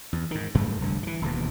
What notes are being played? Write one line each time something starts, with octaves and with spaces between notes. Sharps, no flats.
E2
G#2 D#3
F#1 G#2 G3 A3
F1 C2 G2 D3
D#3 E3
E1 D#2 B2